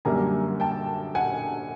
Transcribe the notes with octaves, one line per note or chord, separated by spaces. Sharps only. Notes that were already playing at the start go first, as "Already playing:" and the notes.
F#2 D3 G3 A#3 G#5 A#5
G5 A5
F#5 G#5